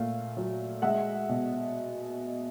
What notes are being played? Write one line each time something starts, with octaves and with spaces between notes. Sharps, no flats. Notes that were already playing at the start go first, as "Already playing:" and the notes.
Already playing: A#2 A3 F5
F#3
G#3 E5 F#5
B2